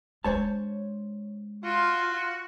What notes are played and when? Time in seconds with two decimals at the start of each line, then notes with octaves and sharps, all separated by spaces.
0.24 G#3 D4 C5 C#5 A5
1.64 F4 F#4